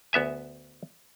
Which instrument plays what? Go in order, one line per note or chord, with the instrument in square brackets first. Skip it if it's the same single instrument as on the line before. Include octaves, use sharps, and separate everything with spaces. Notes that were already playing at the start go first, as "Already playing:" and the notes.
[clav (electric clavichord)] D2 B3 E5 G#5